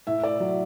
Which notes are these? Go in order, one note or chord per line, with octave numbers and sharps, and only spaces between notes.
A2 E5
D5
F#3